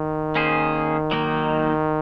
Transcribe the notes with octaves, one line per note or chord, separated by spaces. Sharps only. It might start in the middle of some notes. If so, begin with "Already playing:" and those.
Already playing: D#3
A#3 C#4 G#4 C5
F#3 A#3 D#4